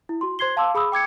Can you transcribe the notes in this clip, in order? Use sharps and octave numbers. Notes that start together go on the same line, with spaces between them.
E4
F#4 C6
C5 C6 G#6 C7 G7
F5 A5 C6 D6 E6
G#4 B5 D#6 E6
G5 D6 G#6 C#7